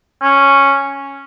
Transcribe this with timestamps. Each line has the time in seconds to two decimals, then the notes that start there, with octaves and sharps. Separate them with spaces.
0.22 C#4